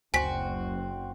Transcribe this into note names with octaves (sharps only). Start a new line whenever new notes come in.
F#1 D2 C4 F#4 G#5 B6